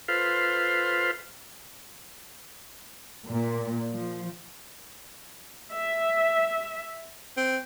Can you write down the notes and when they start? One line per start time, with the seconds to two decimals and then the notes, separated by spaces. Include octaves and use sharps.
0.08 F4 A4 B4 C5 F5
3.29 A#2
3.92 F3
5.71 E5
7.37 C4